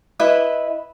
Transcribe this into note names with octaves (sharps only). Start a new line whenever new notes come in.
E4 B4 D#5 E5